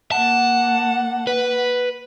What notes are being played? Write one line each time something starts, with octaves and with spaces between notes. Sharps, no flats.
A#3 F#5 A5
B4